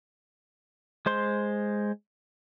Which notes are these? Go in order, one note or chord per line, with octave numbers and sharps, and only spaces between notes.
G#3 C5 C6